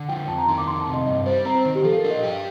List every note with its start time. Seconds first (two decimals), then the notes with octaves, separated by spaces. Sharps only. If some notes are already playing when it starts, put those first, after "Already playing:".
Already playing: D3
0.09 F3 G5
0.28 F2 A5
0.38 A#5
0.48 D#3 C6
0.58 D6
0.67 F2 C6
0.81 A5
0.87 C3
0.94 D#5
1.07 G2 D#5
1.26 G3 C5
1.45 C4 A#5
1.55 C5
1.65 D#3
1.75 G4
1.84 F3 A4
1.97 A#4
2.04 D4
2.10 D#5
2.23 G4